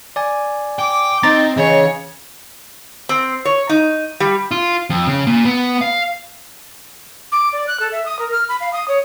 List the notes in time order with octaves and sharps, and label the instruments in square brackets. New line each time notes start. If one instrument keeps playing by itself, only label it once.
[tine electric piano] D5 G#5
[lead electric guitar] G5 [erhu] D6
[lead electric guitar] C4 [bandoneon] D#4 [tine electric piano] A#5 A6
[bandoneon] C#3 [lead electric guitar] E3 [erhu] C#5 [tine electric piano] D#5
[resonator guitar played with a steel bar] C4
C#5
D#4
G3
[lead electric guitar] F4
F2
C#3
A#2
B3
F5
[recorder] D6
D5
F#6
A4
E5
D#6
A#4
F6
B5
F5
D#6
C#5